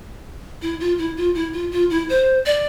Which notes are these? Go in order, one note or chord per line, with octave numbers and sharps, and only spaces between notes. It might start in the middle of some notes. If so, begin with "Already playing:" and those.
E4
F4
E4
F4
E4
F4
F4
E4
C5
D5